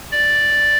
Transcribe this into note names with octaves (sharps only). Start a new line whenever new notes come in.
D5